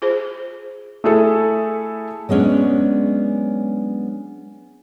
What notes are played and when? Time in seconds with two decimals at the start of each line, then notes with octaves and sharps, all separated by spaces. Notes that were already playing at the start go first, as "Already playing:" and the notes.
0.02 F4 G#4 C5
1.04 A3 E4 G#4 A4
2.29 F#3 G#3 B3 C#4 D4